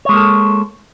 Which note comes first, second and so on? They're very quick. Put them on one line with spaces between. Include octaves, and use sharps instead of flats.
C#5 G#3 A#3 A4